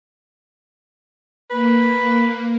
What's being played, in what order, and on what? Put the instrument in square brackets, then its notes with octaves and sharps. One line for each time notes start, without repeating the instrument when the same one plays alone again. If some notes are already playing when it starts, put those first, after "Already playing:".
[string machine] A#3 [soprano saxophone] B4